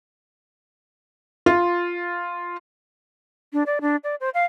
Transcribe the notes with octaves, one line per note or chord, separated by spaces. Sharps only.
F4
D4
D5
D4
D5
C5
F5